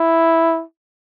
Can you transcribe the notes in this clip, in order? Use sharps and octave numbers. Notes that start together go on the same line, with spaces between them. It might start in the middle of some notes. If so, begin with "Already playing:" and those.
Already playing: E4